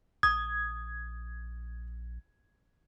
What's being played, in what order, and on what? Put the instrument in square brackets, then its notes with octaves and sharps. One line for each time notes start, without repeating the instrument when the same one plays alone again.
[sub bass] A#1 [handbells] D#6 [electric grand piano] G#6